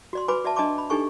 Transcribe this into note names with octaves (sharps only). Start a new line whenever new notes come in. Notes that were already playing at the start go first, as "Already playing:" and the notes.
F#4 D5 C6
F#4 B4 G#5 B5 D6
F#4 D5 E5 A5
D4 D#5 G#5 A5 C6 D6
B5
D4 D#4 G4 A4 G#5 C#6